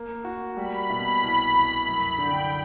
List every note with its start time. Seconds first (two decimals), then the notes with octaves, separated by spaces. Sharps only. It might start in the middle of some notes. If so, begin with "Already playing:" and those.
Already playing: A#3
0.24 F#4
0.57 G3 B5
0.90 B2
1.22 C2
1.54 C2
1.85 F#2 B5
2.18 D3 G5